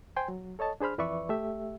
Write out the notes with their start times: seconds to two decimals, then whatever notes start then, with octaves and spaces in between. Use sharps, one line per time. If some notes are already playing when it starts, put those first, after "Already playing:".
0.17 C5 G5 G#5 C6
0.28 F#3
0.59 A4 C#5 D#5 A5
0.80 D4 G#4 C5 B5 F6
0.98 F2 E3 B4 D5 E5 C#6
1.29 A3 G4 E5